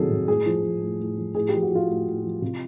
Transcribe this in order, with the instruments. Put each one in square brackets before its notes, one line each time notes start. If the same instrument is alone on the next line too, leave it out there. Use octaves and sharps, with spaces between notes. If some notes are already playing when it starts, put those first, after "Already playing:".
Already playing: [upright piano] C3 D#3 F#3 G#4 A4
C3
A2 G#4
F3
F3
A2
A2
F3
A2 G#4
F3 G4
F#4
F3 F4
A2
A2
F3
C3 F4